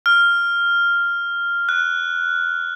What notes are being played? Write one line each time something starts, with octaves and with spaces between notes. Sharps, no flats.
F6
F#6